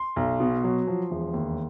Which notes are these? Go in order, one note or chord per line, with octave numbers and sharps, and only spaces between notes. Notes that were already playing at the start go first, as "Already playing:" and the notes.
Already playing: C6
B1
B2
F#3
F3
E1
D#2